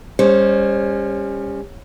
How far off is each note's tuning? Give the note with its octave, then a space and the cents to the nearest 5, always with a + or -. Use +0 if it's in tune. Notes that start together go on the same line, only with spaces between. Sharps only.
G3 +35 C#4 +0 C5 +5